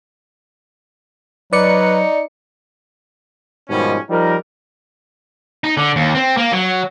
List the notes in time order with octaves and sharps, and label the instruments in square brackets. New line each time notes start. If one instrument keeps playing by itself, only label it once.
[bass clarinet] F#3 [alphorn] D#4 [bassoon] B4 [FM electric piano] D5 C#7
[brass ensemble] G#2 B2 D#3 F3 G3 C#4
F3 G3 D#4 A#4
[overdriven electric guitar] D#4
D3
D#2
C4
A#3
F#3